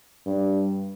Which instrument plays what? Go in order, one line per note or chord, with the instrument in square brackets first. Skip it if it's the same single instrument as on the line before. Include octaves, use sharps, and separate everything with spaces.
[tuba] G2